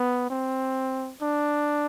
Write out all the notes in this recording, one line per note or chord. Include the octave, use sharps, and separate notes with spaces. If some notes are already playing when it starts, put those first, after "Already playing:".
Already playing: B3
C4
D4